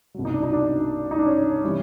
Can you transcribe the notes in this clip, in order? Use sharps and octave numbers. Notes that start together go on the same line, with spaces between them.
C2 B2 F#3
D#4
D4
D#4
D4
D#4
D4
C#4
C3 E3 G3